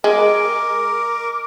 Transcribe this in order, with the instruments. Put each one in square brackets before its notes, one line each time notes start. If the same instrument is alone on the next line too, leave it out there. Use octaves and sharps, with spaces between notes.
[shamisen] G#3 [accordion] A#4 [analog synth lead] D6